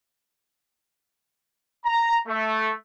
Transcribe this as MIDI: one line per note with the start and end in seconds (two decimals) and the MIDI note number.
1.85 2.18 82
2.28 2.71 57